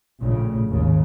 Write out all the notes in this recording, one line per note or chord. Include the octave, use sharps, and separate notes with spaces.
A#1 A2 C#3
G#1 D#2 C#3